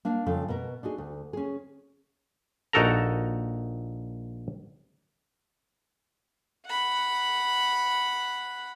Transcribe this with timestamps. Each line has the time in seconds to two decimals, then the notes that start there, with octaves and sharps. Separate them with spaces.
0.05 A#3 D4 F5
0.26 F2 C#3 A4 F5
0.48 B2 B3 A#4
0.83 D4 D#4 F#4 G#4
0.98 D2
1.33 C#4 G#4
2.73 A#1 D#4 F#4 A4 A#4 A#5
6.66 F#5 B5